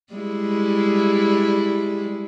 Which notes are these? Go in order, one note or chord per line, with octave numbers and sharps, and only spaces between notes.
G3 G#3 E4